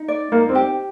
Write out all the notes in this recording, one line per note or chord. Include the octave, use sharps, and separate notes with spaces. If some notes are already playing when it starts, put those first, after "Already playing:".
Already playing: D#4
D5
A#3 D#4
C4
G4